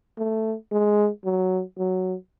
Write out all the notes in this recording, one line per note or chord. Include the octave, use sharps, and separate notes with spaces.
A3
G#3
F#3
F#3